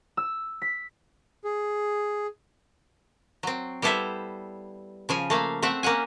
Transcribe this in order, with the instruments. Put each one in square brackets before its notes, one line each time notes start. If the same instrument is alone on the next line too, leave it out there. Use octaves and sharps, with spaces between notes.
[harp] E6
B6
[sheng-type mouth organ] G#4
[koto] F#3 C4
G3 B3 E4 A4 C5 E5
C#3 F3 G#5
A3 A#3 F5
A3 C4 E5 F#5
A#3 C#4 F#5 G#5